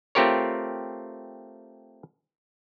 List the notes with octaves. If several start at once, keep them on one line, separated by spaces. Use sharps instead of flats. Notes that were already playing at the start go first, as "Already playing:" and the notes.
A3 C4 F4 G4 A#4 C#5